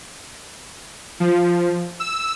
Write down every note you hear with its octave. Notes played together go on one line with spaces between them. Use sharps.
F3
E6